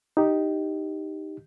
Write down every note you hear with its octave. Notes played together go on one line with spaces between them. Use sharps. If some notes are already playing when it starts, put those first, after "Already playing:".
D#4 G4